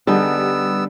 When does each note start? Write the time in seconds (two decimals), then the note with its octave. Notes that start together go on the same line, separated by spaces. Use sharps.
0.07 D3 G3 B3 D#4 G#4 E6